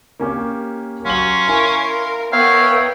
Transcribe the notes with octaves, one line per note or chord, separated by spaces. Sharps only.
A#3 C#4 G4
F#3 C#4 F#4 F5 C6 F#7
E4 A#4 G#5
B3 A#4 C#5 E5 F5 G5